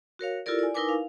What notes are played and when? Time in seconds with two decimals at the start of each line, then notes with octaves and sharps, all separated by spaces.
0.19 F#4 A#4 C#5 F5
0.46 E4 F4 G4 A4 A#4 D5
0.59 D5 G#5
0.74 D#4 E4 A#4 B4 G#5 D6
0.89 F5